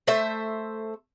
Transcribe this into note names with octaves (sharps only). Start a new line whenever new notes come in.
A3 C5 E5